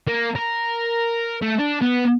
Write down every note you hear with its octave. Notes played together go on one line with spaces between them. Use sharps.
A#3
A#4
A3
D4
B3